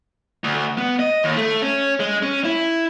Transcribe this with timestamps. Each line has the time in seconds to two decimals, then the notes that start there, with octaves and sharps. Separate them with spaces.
0.44 D2
0.78 B3
0.99 D#5
1.24 D#2
1.37 A3
1.62 C#4
2.00 G#3
2.23 C#4
2.44 E4